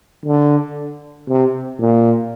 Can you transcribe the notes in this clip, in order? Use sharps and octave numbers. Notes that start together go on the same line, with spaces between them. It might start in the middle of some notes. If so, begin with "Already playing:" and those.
D3
C3
A#2